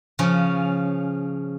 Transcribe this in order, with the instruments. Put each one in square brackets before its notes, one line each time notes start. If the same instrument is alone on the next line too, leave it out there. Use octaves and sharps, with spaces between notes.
[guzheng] C#3 F3 C#4